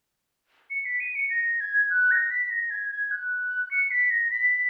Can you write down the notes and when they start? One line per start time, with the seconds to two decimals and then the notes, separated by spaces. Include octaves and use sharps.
0.70 C#7
0.85 B6
1.00 D#7
1.15 C#7
1.30 A#6
1.60 G#6
1.90 F#6
2.11 A#6
2.31 B6
2.50 A#6
2.70 G#6
2.90 G#6
3.11 F#6
3.71 C#7
3.91 B6
4.10 A#6
4.31 B6